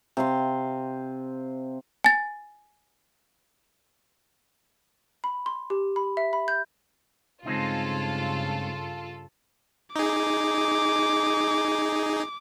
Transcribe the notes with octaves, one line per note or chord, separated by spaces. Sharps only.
C3 F5 C6
G#5 A6
B5
C6
G4
B5
E5
B5
G6
G2 C#3 G#3 C4 D#4 F4 A4
D#4 G#4 D6